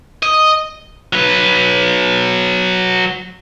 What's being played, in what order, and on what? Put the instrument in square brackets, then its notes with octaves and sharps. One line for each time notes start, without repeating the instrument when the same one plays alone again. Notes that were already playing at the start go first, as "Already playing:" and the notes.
[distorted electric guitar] D#5
F#3 B4